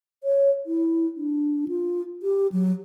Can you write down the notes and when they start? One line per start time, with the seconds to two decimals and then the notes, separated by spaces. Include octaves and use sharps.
0.24 C#5
0.66 E4
1.17 D4
1.68 F4
2.23 G4
2.52 F#3